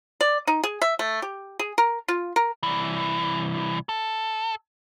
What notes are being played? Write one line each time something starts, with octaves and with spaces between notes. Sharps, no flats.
D5
D#4
G#4
E5
A3
G4
G#4
A#4
F4
A#4
C2 E3
A4